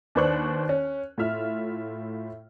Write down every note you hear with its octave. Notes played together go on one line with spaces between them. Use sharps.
D#2 D4 B4 C5 C#6 F#6
C#4
A2 F4 E5 F6